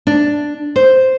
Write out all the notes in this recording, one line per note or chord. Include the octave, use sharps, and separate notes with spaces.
D4
C5